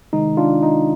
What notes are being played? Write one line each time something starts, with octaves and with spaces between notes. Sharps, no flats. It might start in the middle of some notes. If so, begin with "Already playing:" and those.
C3 D#3 G#3 D#4
D4 F4
D#4